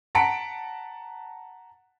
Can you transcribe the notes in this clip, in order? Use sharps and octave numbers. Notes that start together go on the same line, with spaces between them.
F#5 A5 A#5 B6 C#7 D7